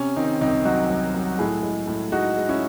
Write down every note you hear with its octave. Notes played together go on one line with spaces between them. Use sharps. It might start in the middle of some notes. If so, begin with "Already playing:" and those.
Already playing: C3 C#4
D#3 C4 D#4
C2 C4 D#4
F#3 D#4 F#4
F#3
F#3
A2 E4 G#4
G#3
A2
G#3 D#4 F#4
G#3
C#4 E4